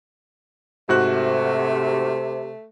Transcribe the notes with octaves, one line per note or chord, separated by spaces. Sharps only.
G#2 C3 A3 F#4 F#6